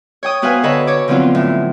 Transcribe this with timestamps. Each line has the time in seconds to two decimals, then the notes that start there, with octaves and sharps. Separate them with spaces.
0.23 C#5 G5 D#6
0.42 B3 F#4 B4 C5 F5 G#5
0.63 D3 A4 C#5 D#5 B5
0.87 C#5 D6
1.08 D3 F3 F#3 B3 C4 F4
1.35 A2